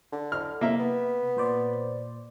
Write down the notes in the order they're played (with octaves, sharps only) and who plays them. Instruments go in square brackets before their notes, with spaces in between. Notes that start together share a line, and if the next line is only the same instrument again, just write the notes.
[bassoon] D3
[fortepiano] F6
[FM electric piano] C3 [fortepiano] A#3 E5
[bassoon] B3
[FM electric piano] A#2 C5 D5